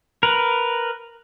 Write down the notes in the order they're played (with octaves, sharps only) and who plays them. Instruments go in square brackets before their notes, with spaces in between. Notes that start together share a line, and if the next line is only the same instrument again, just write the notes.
[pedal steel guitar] A#4 B4